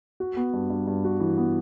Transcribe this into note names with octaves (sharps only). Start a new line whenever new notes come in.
F#4
B3
G2
G2
G2
F#4
E3
B3